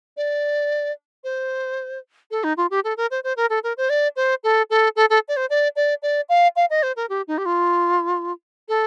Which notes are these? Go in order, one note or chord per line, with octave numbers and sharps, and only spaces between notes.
D5
C5
A4
D#4
F4
G4
A4
A#4
C5
C5
A#4
A4
A#4
C5
D5
C5
A4
A4
A4
A4
D5
C5
D5
D5
D5
F5
F5
D#5
C5
A#4
G4
D#4
G4
F4
A4